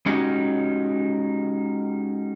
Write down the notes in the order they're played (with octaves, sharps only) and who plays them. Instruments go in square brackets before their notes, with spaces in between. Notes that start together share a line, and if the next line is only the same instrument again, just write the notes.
[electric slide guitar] G#3 C#4 D#4 F#4 G4